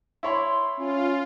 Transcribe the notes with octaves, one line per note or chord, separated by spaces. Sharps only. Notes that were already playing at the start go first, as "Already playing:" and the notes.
E4 C#5 B5 C6
C#4 F4